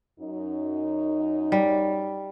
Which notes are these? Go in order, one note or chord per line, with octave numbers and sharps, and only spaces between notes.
F#2 D#4
G3